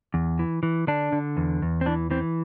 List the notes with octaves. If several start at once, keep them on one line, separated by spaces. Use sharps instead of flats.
E2
E3
E3
D3 D4
D3
E2
E2
C4
E3 D4
E3 C4